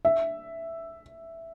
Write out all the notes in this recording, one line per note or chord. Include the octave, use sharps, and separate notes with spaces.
E5